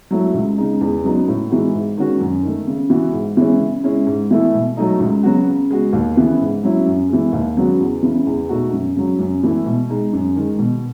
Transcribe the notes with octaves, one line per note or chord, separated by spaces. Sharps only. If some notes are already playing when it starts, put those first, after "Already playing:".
F#3 A3 E4
C#2
C#3 G#3 D#4
E2
C#3 F#3 B3 D#4
A2
E3 G#3 D#4 F#4
G#2
D#3 G#3 C#4 F#4
F#2
D#3 A3
C#3
E3 B3 F#4
G#2
E3 G#3 C#4
C#3
G#3 C#4 E4
G#2
E3 A3 E4
B2
F#3 A3 D#4
C#2
C#3 F#3 B3 F#4
C#3
G#3 B3 F#4
D#2
C#3 E3 B3
G#2
F#3 C#4 E4
F#2
E3 G#3
D#2
C#3 F#3 B3 F#4
E2
C#3 E3
E2
B2 A3 D#4 F#4
F#2
C#3 F#3
F#2
E3 A3 E4
B2
G#3 D#4
F#2
D#3 G#3
B2